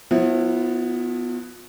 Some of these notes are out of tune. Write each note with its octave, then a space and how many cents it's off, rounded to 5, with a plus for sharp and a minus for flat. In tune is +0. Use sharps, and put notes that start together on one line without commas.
F3 +40 B3 +0 E4 +0